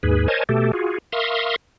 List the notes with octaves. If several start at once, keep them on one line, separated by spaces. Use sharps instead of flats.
D#2 G#2 G#4 B4
A#4 C5 C#5 D#5 G#5 A5
B2 A3 G4 A4
F4 F#4 G#4
A#4 E5 F5 C6 C#6 D#6